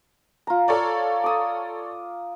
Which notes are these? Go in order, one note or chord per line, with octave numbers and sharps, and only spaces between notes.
F4 A#5
A4 C#5 D5
D6 D#6